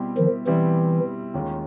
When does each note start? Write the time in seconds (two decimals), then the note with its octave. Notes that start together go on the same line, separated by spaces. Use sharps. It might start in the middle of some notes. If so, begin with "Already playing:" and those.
Already playing: B2 G3 C4 E4 G4
0.17 D#3 F3
0.46 B2 E3 G3 C4 E4 G4
1.34 D#2 D#3 G#3 C#4 F4